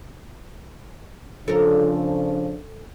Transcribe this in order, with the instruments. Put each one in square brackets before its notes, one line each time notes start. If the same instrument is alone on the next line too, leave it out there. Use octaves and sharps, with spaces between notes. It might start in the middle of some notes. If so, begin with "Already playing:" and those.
[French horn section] C#3 F3 D4 [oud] A4 A#4